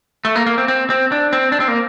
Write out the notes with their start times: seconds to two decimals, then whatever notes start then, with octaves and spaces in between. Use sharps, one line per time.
0.25 A3
0.35 A#3
0.46 A#3
0.58 C4
0.68 C4
0.90 C4
1.12 D4
1.33 C4
1.52 D4
1.60 C4
1.68 A#3